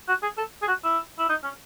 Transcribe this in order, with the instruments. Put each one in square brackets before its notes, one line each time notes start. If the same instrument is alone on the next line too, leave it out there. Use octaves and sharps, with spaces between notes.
[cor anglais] F#4
G#4
A4
G#4
F#4
E4
E4
D#4
C#4